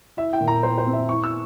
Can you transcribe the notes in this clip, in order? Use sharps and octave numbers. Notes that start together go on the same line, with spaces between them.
E4 E5
G5
A#2
A#5
F3 C5
C5
C4
E5
E4 C#6
E6